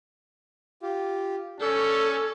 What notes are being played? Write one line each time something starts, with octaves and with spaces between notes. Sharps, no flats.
F4 G4
C#4 A4 D5 G6